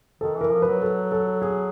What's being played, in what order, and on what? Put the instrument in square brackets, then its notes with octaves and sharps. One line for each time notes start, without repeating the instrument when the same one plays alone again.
[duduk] D#3 [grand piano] A4
[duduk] E3 [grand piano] A#4
[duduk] F3
[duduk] F#3 [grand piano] B4
[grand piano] A4
A4
G#4